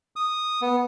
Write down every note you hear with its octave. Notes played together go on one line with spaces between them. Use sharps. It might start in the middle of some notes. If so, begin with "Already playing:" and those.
D#6
B3